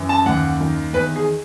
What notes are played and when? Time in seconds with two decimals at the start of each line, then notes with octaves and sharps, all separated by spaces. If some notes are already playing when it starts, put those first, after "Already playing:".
Already playing: F#2 E3
0.09 A5
0.26 D#2 F#5
0.60 D#3
0.93 E2 B4
1.16 G#4